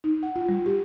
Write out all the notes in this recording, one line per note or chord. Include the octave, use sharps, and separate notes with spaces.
D#4
F#5
F4
G3
G4